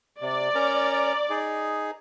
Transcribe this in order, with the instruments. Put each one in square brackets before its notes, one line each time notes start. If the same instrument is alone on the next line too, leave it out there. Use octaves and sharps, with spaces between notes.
[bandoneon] C3 [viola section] D5
[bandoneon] C#4 A#4 A#5
D#4 G#4